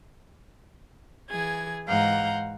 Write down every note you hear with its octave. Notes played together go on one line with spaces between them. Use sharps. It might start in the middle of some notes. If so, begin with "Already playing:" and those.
E3 G#4 G#6
G#2 E3 F5 F#5 A#5 G6